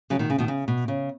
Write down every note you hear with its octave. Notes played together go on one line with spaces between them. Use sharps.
C#3 F#3
B2 D#3
C#3
B2 D#3
C#3
B2
C#3